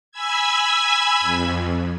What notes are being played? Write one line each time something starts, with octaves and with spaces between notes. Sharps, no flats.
G#5 B5 E6 G#6
F2